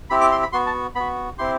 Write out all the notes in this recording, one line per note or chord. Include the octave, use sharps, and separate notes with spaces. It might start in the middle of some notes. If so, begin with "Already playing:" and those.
C4 E4 G4 B5
D6
C6
B5
B3 F#4 C6
A5
B3 F#4 B5
C4 E4 G4 C6